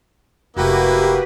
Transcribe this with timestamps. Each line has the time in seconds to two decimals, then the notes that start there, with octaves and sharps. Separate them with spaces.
0.56 F1 A#3 E4 F#4 G4 B4